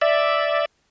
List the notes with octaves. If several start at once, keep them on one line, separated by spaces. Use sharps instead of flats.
D5 E5